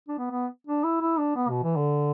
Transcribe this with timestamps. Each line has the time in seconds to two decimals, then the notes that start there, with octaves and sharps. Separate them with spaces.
0.08 D4
0.18 B3
0.31 B3
0.67 D4
0.84 E4
1.01 E4
1.18 D4
1.36 B3
1.49 B2
1.63 E3
1.76 D3